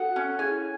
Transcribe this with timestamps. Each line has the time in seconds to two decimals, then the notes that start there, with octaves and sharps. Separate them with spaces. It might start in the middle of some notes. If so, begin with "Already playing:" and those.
Already playing: F#4 A4 F#5
0.16 C#4
0.39 E4 G#4 G#5